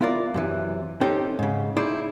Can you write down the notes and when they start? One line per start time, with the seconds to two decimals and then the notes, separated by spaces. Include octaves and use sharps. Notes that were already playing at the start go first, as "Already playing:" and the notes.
0.01 B3 E4 F4 A#4 D5
0.34 F#2 C3 E3
1.01 C4 C#4 D#4 G4 A4 G5
1.39 G#2 C#3
1.76 D#4 E4 G#4 C5 D5